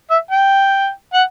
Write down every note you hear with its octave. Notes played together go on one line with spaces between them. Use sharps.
E5
G5
F#5